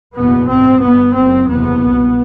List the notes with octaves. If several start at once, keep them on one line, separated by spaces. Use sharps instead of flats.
F#1 E2 B2 B3
A1 G2 C4
G1 G2 B3
F#1 F#2 C4
F#1 E2 C3 B3
C2 B2